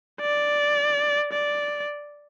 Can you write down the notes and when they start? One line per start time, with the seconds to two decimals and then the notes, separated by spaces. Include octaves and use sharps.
0.21 D5
1.33 D5